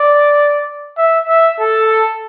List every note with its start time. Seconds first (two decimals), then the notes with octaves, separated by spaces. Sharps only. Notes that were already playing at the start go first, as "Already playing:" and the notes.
Already playing: D5
0.98 E5
1.29 E5
1.60 A4